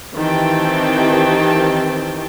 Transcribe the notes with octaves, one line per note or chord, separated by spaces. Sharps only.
D#3 E3 C4 G4 G5 A5